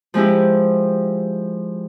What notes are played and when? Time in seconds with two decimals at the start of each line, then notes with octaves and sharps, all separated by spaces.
0.14 F3 G#3 C4 E4 G4